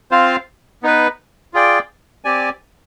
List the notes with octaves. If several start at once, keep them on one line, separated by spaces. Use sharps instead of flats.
C4 F4 C5 F5
B3 D#4 B4
F4 G#4 D5 G5
C4 G4 D5 G#5